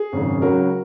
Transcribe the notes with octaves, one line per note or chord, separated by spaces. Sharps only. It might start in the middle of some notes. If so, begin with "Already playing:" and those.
Already playing: G#4
G#1 F#2 C#3
C#2 C#3 F#3 F#4 A#4